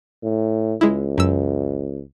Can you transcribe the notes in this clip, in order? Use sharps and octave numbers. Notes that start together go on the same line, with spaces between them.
A2
C#2 G#3 E4
F#2 E6